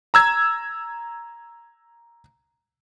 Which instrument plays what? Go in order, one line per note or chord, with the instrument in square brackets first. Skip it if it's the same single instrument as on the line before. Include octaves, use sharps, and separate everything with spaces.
[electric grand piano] A#5 E6 G#6